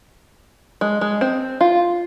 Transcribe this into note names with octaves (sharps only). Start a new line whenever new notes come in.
G#3
G#3
C4
F4